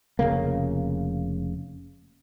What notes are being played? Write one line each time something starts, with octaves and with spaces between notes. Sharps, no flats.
F1 F#2 C#3 A#3